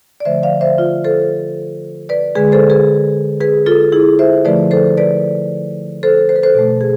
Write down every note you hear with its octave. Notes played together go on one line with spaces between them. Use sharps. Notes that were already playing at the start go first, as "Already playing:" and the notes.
D5
D3 F3 A3 C5 E5
D5 F5
C5 E5
F4
A4 C5
B4 D5
D3 G#3 G#4 B4
A4 C5
G#4 B4
G#4 B4
F4 A4
E4 G#4
C5 E5
D3 F3 A3 B4 D5
A4 C5
B4 D5
A4 C5
C5
B4
A4 C5
B2 A3
G#4